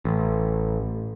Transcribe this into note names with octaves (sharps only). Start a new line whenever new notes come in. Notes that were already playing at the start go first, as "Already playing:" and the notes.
A1